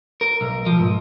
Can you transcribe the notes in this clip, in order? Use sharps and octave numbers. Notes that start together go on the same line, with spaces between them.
A#4
B1
F3
G#2